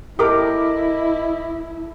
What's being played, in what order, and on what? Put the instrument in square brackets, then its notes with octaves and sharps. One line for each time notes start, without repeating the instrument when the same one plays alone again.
[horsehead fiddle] E4 [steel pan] G4 A#4 [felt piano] A4 D6 [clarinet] D#5